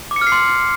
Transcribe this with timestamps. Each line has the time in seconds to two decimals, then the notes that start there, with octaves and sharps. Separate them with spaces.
0.11 D6
0.16 C#7
0.21 F6
0.27 C7
0.32 C6